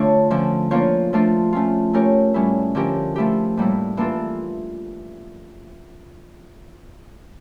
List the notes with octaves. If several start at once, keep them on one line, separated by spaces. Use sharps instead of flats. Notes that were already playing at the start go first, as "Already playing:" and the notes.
Already playing: D3 A3 D4 F4 C#5
D3 F3 C#4
F3 A#3 D4 F4 C#5
F3 A3 D4 F4
A3 C#4 F4
A3 C#4 G4 A#4 C#5
A2 G3 C#4 E4
D3 F3 C#4 G4 A#4
F3 A3 E4 G4
A2 G3 A#3 E4
E3 A#3 D4 F4 A4